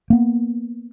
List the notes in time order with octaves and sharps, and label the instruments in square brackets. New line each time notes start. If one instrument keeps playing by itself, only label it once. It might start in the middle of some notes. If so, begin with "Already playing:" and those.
[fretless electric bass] A#3 B3